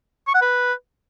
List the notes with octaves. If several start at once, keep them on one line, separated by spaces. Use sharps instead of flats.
C#6
F#5
B4